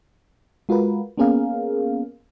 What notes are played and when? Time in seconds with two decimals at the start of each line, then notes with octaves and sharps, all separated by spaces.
0.69 G#3 F4 F#4 A#4 B4
1.18 A#3 B3 C#4 G#4 A#4 F5